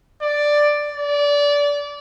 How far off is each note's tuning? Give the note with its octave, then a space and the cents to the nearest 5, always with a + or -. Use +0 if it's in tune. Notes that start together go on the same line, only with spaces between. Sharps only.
D5 +5
D5 -25